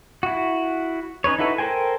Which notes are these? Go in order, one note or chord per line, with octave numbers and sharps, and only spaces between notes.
E4 F#4
C#4 D#4 B4 C#5
D#4 E4 F#4 A4 B4
A4 A#4 C5 G5 G#5